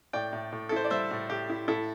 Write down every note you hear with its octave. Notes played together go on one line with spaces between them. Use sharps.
A2 D5 G5
A2
A2
A4
E4 C5
D5
G3 C5 E5
A2
A2 G4
E4
A2 E4 A4